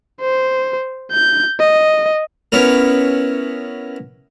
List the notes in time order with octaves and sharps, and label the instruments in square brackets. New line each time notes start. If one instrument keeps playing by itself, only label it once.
[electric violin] C5
G6
D#5
[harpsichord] B3 C#4 E4 A#4